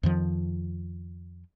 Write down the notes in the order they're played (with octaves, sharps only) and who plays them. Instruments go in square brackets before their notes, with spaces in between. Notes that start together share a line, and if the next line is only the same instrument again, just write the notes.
[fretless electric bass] F2 D#3 F3